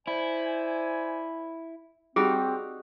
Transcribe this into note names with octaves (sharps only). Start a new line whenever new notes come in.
E4 C5 D5 G#5
G3 C4 D#4 F#4 G#4